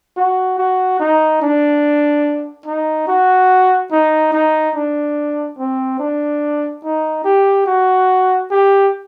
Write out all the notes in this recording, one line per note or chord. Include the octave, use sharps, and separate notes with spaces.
F#4
F#4
D#4
D4
D#4
F#4
D#4
D#4
D4
C4
D4
D#4
G4
F#4
G4